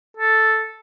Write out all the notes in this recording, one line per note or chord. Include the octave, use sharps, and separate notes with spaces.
A4